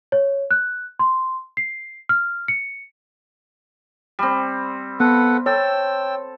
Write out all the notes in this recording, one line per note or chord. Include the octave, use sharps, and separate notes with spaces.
C#5
F#6
C6
C7
F6
C#7
G3 C4
B3 A4 B4 F#5
A4 C#5 G5 E6